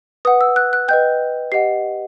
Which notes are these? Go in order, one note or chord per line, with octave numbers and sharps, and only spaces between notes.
B4 F#5 D#6
E6
F#6
F#6
B4 D#5 G5 G6
G4 D#5 F#5 C7